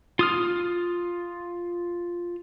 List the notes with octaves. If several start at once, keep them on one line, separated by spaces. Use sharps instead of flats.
F4 D#6 F6